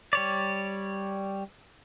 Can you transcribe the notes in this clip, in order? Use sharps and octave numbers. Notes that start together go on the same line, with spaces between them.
G3 C#5 D5